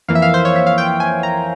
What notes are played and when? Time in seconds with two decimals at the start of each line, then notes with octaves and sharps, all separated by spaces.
0.08 F2 E3 A#3 F5
0.15 E5
0.22 F5
0.34 C5
0.45 C#5
0.56 E5
0.67 F5
0.78 G5
1.00 G#5
1.23 A#5